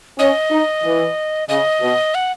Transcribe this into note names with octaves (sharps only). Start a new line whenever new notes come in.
C#4 D#5
D#4
E3
C#3 D#5
B2
F#5